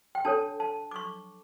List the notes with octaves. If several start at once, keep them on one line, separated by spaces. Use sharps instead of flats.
G5
D4 A4 C#5 A5
A5
D6
C#6